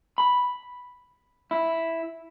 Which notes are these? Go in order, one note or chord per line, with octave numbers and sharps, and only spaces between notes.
B5
E4